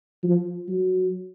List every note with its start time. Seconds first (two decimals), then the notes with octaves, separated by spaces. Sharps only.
0.24 F3
0.68 F#3